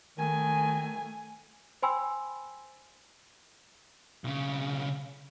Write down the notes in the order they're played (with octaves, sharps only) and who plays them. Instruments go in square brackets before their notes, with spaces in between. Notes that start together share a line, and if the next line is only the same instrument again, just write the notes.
[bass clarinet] D#3 [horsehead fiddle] A3 G#5
[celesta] C5 G5 G#5 B5 C6 E6
[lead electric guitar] B1 C#3